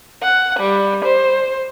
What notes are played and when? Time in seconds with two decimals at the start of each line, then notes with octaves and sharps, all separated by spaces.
0.22 F#5
0.59 G3
1.04 C5